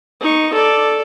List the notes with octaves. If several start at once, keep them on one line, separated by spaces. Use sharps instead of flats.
D#4 C#6
A4 D5